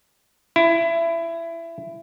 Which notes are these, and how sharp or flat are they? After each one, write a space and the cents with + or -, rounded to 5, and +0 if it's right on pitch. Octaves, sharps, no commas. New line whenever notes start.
E4 +20